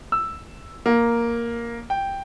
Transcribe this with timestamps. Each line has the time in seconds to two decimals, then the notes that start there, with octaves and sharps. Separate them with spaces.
0.12 E6
0.86 A#3
1.90 G5